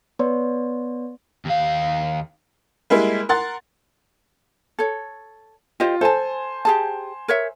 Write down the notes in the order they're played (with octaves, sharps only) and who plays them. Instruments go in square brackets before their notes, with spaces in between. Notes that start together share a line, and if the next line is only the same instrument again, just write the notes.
[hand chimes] B3 B4 C#5 D5 C6
[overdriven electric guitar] D#2 F5
[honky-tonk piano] G3 G#3 A#3 E4
A#4 F#5 C6 A6
[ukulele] A4 C#5
[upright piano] F4 [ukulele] G4 C5 D#5
[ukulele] A4 A5 [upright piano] C5 G#5
[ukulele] G4 G#4 A5
A#4 C#5 E5